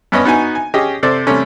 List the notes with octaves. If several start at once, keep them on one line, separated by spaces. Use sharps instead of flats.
G2 B3 C#4 D#5 B5
B3 D#4 F#4 G#5
G#5
C#4 G4 G#4 D#5
C3 A4 C5 D5
C3 G3 A3 C#4